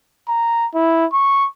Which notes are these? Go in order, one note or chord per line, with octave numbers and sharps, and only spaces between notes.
A#5
E4
C#6